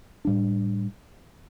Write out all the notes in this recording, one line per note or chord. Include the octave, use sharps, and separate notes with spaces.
A2 G3 D4